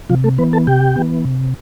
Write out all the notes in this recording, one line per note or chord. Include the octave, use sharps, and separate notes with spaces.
C3 F3 F4
A3 A4
E3 B3 B4
A4 A5
C3 G4 G5
E3 B3
C3